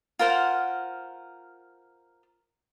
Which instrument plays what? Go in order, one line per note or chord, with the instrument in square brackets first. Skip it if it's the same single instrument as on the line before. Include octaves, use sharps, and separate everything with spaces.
[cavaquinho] F4 A#4 C5 F#5